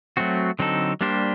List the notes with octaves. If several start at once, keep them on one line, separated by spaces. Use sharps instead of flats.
F#3 A3 C4 F#4
D3 F#3 C4 D#4 A4
G3 A#3 D4 G4 C5